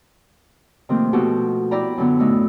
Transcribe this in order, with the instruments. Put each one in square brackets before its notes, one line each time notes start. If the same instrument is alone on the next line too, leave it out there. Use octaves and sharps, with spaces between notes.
[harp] C3 D#3 F3 A3 A#3 C4
B2 F3 D#4 F#4 G4 A4
E4 D5 G5 A#5 B5
F#2 D3 B3
A2 A3 D#4 F#4 E6